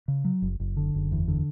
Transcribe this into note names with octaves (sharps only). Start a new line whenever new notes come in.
C#3
F#3
F#1
F#1
D3
F#1
E2
D3